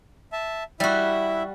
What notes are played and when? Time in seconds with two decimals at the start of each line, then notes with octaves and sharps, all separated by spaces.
0.33 E5 A5
0.80 G3 E4 F#4 E5